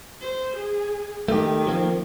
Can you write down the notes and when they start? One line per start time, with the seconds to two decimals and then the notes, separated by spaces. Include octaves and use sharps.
0.21 C5
0.56 G#4
1.28 D#3 A3 G4
1.67 F3 A#3 C4